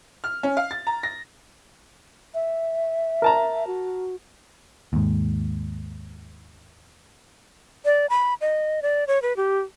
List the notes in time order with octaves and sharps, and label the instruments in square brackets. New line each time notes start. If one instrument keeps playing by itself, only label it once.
[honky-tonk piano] F6
C#4
F5
A6
A#5
A#6
[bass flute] E5
[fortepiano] A#4 A5 A#5
[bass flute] F#4
[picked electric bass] D#2 G#2
[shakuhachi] D5
B5
D#5
D5
C#5
B4
G4